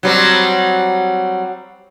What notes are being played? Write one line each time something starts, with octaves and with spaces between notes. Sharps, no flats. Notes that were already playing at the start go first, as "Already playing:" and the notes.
F#3 G3 C4